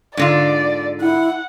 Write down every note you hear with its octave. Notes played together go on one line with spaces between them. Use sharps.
G#2 D3 F4 D5
E4 F#5